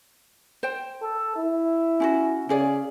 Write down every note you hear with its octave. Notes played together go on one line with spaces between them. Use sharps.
C5 G5
A4
E4
C#4 F4 F#4
C#3 C#4 G#4 D5